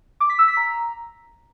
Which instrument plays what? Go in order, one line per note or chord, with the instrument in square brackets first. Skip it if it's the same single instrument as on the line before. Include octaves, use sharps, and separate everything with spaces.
[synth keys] D6
B6
E6
B6
A#5